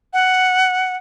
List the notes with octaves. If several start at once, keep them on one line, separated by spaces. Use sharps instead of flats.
F#5